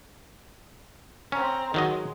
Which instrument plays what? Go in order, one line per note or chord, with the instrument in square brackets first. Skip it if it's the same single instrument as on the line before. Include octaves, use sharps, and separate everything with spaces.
[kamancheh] C4 A#5 [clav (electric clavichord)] C#4
[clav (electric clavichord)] D#3 F#3 D#5 [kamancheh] G#3